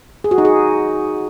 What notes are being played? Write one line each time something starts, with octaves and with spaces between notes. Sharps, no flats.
G#4
F#4
D#4
G#4